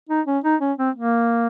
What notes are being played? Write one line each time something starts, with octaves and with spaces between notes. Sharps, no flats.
D#4
C#4
D#4
C#4
C4
A#3